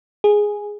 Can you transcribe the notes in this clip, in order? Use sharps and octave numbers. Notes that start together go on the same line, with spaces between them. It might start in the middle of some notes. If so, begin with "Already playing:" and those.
G#4